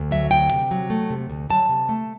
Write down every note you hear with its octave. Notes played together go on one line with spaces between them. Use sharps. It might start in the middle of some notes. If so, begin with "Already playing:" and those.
Already playing: D2
F#3 E5
D2 G5
C3
F#3
A3
C3
D2
F#3 A5
C3
A3